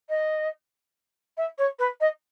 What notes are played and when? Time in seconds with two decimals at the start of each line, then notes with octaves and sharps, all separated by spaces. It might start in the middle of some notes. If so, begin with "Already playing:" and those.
0.09 D#5
1.37 E5
1.58 C#5
1.78 B4
2.00 D#5